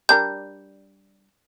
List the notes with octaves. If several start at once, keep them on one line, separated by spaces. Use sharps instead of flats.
G3 D4 A#4 G6